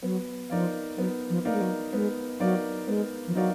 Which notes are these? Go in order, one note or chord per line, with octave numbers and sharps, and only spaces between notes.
F#3 B3
F3 D#4 A#4 D5 F5
F#3 B3
F3
A#3 D#4 A#4 D5 F5
G#3
F#3
G#3 B3
F#3 D#4 A#4 D5 F5
G#3 B3
F3
F#3 D#4 A#4 D5 F5